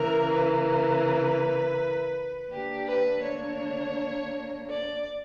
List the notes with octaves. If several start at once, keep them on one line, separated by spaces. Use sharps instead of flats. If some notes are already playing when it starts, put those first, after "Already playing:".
Already playing: C#3 E3 A#3 A#4
B4
D3 A#3 D4 G4
B4
C#5
D5